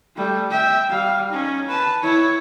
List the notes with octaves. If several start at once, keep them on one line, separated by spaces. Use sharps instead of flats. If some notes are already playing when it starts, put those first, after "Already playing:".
G3 A3
E5 G5
G3 F5
C#4 D#4
B4 A5
E4 C#5